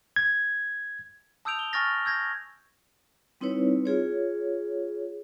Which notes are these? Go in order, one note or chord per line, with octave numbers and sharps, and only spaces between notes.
G#6
A5 D#6 E6 G6 D7 F7
G7
G#5 C#6 F6 A6 A#6
E6 G6 G#6 A#6
G3 C4 D#4 E4 B4 C#5
F4 G#4 C#5